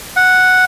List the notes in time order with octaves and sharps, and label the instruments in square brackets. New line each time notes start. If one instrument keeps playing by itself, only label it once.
[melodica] F#5